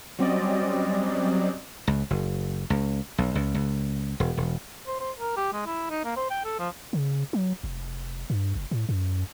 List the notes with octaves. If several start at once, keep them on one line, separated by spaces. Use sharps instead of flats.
F#3 G3 C4 C#4 D5 D#5
C#2
F#1
C#2
B1
C#2
C#2
E1
E1
C5
C5
A#4
G4
G#3
E4
D#4
A#3
C5
G5
A4
F3
C#3
F#3
F1
G2
F#1
A2
F#2